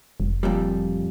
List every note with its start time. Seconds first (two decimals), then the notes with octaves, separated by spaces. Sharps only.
0.20 F1
0.43 F2 A#2 G3